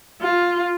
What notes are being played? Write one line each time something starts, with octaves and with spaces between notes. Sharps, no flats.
F4